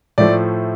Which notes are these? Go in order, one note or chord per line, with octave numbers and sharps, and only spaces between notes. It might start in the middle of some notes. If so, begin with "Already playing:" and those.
A2 F3 A3 D5